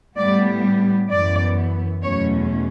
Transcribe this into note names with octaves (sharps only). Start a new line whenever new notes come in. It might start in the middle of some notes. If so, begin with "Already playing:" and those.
A2 G3 B3 D5
F#2 E3 B3 D5
E2 B2 F#3 A3 C#4 C#5